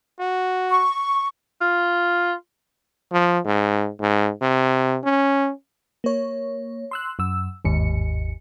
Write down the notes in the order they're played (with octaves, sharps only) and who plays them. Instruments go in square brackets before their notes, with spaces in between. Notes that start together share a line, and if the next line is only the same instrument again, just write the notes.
[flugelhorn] F#4
[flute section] C#6
[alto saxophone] F4
[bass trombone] F3
G#2
G#2
C3
C#4
[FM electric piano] A#3 C#5
C6 E6 F#6
F#2 E6
G1 D#2 G#2 C#7